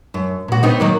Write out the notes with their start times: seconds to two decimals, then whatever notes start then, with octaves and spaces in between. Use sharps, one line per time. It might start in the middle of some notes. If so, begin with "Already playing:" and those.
0.14 F#2
0.48 A#2 F#4
0.63 B3 C4 D#4
0.80 D#3 F#3 A#3